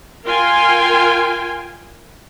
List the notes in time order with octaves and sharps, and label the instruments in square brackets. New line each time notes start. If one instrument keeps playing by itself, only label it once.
[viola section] F4 A#4 F5 G5 G#5 C6